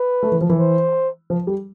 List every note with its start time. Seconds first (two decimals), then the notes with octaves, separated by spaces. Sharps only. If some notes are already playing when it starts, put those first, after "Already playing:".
Already playing: B4
0.23 A3
0.32 E3
0.41 F3
0.49 E3
0.59 C5
1.30 F3
1.47 G3